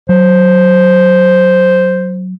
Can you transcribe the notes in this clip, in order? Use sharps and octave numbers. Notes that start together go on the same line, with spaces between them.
F#3 C5